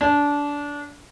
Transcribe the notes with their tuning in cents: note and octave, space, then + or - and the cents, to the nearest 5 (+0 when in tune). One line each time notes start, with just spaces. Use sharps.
D4 -20